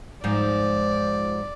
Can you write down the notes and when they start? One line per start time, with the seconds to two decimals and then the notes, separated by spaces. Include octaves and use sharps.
0.24 G#2 F3 D5